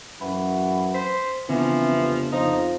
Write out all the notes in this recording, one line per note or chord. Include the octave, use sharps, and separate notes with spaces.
F#2 E3 F#4 B5
C5 B6
C#3 E3 F3 B3 C4 D4
F1
F2 F3 D#4